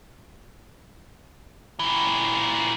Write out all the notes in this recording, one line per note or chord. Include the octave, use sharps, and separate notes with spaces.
A#2 E3